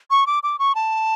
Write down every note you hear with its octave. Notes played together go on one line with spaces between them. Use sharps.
C#6
D6
D6
C#6
A5